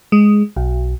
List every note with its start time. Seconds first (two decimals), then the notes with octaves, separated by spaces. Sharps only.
0.12 G#3
0.56 B1